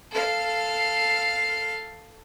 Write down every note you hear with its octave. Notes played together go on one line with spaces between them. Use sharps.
A4 F5